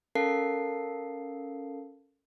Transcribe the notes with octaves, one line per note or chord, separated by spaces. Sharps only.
C#4 A4 A#4 F5 A5 C7